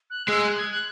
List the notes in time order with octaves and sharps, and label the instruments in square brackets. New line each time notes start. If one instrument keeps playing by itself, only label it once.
[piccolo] F#6
[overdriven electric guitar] G#3 [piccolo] E6
[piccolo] F#6
G#6
F#6